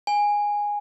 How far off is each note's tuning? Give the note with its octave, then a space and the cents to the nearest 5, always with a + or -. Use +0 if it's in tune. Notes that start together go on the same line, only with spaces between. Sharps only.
G#5 -10